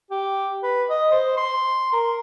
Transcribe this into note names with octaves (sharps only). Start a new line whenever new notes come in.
G4
B4
D#5
C5
C6
A#4